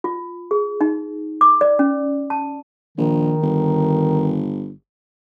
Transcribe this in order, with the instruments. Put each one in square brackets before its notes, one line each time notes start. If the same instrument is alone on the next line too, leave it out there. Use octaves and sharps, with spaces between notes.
[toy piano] F4
G#4
D#4
D6
D5
C#4
A5
[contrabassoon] A#1 [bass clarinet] D#3
[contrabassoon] G1